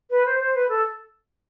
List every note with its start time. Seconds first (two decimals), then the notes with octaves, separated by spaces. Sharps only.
0.10 B4
0.26 C5
0.40 C5
0.55 B4
0.69 A4